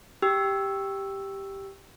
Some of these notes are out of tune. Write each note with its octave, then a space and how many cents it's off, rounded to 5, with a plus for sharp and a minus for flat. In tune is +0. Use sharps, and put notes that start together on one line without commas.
G4 +0 G5 +0 E6 +0